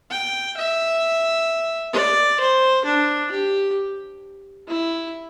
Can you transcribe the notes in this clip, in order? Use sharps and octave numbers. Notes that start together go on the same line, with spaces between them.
G5
E5
D5
C5
D4
G4
E4